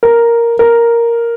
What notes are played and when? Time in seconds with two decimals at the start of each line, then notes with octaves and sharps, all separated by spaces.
0.03 A#4
0.59 A#4